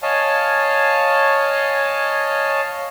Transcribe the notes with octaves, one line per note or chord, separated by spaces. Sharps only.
C#5 D#5 F5 G#5 A5